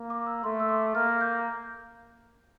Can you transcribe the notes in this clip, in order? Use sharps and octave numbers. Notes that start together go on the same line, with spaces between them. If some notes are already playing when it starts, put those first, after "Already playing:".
Already playing: A#3
D6
E6
A3 C6
E6
D6
A#3 F6
G6